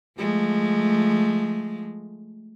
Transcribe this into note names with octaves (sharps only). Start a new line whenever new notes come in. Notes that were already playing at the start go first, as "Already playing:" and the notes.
F3 G#3 A3